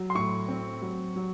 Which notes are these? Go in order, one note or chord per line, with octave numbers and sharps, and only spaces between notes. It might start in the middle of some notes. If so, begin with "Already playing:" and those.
Already playing: F#3
C6
A2 C#6
C4
F#3
F#3